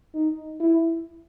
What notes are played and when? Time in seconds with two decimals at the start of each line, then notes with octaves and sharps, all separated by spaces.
0.14 D#4
0.60 E4